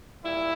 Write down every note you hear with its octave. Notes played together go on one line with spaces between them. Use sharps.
A#2 G3 E4